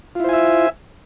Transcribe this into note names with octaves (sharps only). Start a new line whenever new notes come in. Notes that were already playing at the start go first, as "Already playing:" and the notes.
E4 F4 C5 E5 G#5